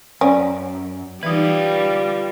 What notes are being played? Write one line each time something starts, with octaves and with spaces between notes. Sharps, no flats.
F#2 C#4 D5
E3 G3 D#4 F4 B4